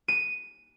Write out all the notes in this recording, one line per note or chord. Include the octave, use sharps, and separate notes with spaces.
D#7